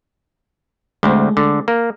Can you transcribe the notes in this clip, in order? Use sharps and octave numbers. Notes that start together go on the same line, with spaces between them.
D2 G#3 A3 C4
D3
A#3